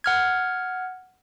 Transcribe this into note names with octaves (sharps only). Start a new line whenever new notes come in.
F#5 F6 G#6